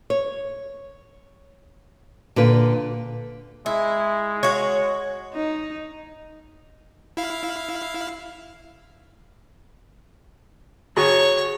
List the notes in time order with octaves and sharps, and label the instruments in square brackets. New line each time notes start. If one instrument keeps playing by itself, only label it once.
[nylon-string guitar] C#5
A#2 D3 B4
[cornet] G#3 [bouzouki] E4
[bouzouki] F#4 C#5
[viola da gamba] D#4
[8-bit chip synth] E4 F5
[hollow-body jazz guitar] F#4 G#4 A#5 [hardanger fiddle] C#5 C#6